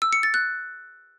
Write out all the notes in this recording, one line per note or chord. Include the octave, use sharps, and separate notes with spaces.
E6
C#7
A6
F#6